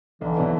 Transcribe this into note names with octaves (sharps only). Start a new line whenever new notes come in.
B1 D3 E3
B2 F#3 B3 E4